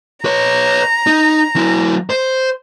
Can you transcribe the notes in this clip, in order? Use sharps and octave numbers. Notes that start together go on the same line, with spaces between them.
B4 C#5 A#5
D#4
F#3 E4
C5